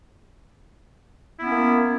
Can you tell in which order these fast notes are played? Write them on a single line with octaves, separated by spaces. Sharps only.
E4 B3 C#4 A#3